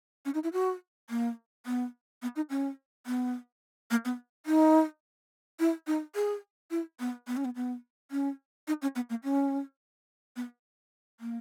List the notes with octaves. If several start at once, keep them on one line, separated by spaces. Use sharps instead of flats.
C#4
D#4
E4
F#4
A#3
B3
B3
D#4
C#4
B3
A#3
B3
D#4
E4
D#4
G#4
E4
B3
B3
C#4
B3
B3
C#4
D#4
C#4
B3
A#3
C#4
B3
A#3